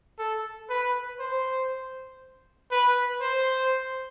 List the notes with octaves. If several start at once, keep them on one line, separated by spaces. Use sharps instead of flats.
A4
B4
C5
B4
C5